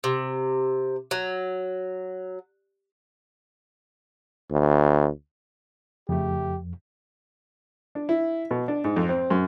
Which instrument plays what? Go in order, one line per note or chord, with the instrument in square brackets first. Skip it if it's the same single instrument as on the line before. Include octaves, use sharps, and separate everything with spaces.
[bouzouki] C3
F#3
[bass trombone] D2
[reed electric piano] F2 [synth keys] C#3 A3 [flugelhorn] G4
[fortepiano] D4
E4
B2
D4
G#2
F2
C4
F#2